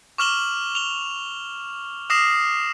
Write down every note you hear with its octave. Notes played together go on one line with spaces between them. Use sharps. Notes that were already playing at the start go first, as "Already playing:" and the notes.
C#6 D6 F6 E7 F#7 G7
F7 G7
D6 D#6 F6 A#6 C7 E7